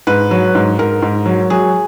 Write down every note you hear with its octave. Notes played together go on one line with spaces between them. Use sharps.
G#2 B4
F#3
G#2
G#2 A#4
G#2
F#3
F#3 G#4